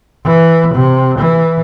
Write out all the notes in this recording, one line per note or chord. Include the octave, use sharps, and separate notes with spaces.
E3
C3
E3